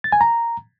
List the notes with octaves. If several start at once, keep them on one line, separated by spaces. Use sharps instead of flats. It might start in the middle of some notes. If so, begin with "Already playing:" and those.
A6
G#5
A#5